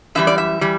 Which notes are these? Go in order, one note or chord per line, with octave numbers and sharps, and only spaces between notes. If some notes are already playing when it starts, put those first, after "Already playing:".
F#2 E3 G3 E5
D5
E5
E3 G3